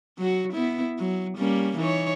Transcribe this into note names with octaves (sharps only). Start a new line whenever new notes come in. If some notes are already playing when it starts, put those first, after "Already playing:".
F#3 F#4
B3 E4
F#3
G3 A#3 C#4
E3 D#4 C#5